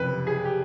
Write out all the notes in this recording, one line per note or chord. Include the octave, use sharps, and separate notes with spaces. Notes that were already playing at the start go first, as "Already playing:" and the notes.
Already playing: F#1 F2 C3 B4
G#4
G4